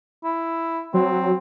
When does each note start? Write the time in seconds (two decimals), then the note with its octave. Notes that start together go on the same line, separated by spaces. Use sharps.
0.24 E4
0.94 F#3 C4